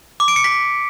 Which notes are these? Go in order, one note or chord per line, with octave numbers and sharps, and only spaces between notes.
D6
D7
C#7
B6